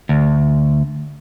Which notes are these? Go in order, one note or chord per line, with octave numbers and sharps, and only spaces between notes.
D2